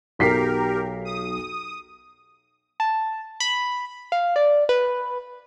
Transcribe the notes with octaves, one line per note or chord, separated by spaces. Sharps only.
B1 G4 A#4 B6 C7
D#6
A5
B5
F5
D5
B4